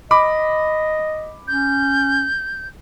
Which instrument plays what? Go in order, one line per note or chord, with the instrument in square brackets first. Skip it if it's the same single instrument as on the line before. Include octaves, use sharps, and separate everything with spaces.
[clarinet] D#5 [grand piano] B5 D6
[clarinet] C#4 [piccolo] G6